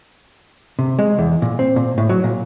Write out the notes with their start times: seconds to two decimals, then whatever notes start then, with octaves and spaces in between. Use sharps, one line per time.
0.79 C3
0.99 G#3
1.19 E2
1.42 A#2
1.59 C4
1.76 A#2
1.98 A2
2.09 F#3
2.24 A#2